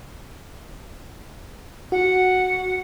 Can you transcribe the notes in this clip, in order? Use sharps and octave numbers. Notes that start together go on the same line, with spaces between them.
F#4 F#5